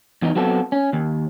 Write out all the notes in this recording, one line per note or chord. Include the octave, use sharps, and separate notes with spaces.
E2 E3 D#4
F#3 B3 C4 A4
C#4
D#2